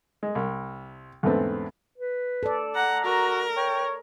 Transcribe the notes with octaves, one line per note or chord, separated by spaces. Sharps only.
G#3
C2
E2 G#2 D3 A3 B3 C4
B4
A4 D5
F#5 A#5
F#4 A#4
C#5 G5